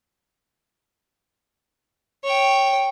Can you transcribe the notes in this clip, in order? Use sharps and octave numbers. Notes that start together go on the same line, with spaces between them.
C#5 G5